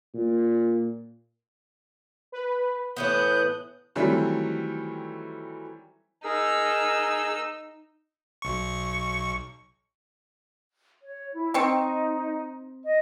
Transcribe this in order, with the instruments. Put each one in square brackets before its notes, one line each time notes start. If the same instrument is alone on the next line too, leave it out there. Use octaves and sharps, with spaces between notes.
[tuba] A#2
[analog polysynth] B4
[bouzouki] A2 E3 B3 [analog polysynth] D#6 F#6 [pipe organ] G6
[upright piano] D#3 E3 F#3 G3 A3 C4
[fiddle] D#4 E6 [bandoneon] G#4 A#4
[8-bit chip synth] B1 C#6
[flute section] C#5
E4
[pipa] C4 C#6 [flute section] D#4
[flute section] D#5